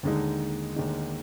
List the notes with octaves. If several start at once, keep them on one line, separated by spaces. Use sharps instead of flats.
D#2 D3 G#3 D#4
D#2 D3 G#3 D#4